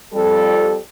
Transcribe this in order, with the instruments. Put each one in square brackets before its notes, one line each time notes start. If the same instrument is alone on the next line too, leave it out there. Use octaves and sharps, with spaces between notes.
[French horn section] F2 G3 A4